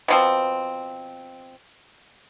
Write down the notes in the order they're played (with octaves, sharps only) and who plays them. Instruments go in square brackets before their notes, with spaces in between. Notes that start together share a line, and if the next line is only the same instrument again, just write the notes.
[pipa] B2 F3 C4